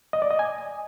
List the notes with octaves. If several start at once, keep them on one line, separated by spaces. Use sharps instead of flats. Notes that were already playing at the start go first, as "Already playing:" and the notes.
D#5
D5
D#5
G#5